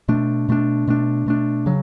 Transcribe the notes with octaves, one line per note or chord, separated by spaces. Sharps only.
B2 A3 D4
B2 A3 D4
B2 A3 D4
B2 A3 D4
C#3 F#3